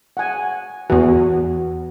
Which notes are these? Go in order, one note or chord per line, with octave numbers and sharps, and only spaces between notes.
F#5 G#5
E2 E3 F#4